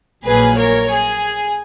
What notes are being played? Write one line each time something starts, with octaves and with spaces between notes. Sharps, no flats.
A#1 A#2 F#3 A#3 G#4 B4
A#4 C#5
G#4